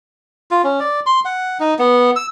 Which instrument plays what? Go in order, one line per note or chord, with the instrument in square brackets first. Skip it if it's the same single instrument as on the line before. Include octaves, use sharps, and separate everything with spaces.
[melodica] F4
C#4
D5
C6
F#5
D#4
B3
E6